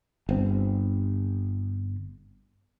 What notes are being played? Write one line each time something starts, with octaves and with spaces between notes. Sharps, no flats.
G1 C4